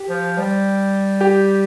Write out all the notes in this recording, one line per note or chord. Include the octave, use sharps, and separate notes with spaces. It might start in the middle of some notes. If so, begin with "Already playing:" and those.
Already playing: G4
F3
G3
G4